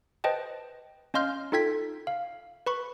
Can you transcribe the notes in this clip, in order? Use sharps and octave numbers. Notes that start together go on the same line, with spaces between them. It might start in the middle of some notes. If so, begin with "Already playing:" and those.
B4 C5 D#5 G5 A5
C#4 D#5 F5 C6 F6 G6
D#4 F4 A4 G5 G#6 B6
F5
B4 B5 C#6